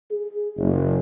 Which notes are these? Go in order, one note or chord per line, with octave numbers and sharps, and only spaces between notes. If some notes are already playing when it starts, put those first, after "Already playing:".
G#4
F#1